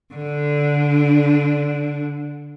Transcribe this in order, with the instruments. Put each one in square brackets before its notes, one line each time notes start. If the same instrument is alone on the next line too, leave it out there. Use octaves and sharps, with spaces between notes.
[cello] D3 D4